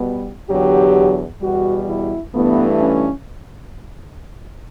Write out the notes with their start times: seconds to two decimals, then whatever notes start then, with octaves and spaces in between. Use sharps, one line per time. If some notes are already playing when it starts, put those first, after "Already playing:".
Already playing: B2 G3 B3
0.50 E2 D3 F#3 G4
1.41 E2 B2 G3 F#4
1.88 E4
2.34 G2 E3 A3 B3
2.80 C#4